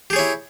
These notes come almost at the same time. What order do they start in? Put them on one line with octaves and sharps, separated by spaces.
G4 G#4 C#5 E4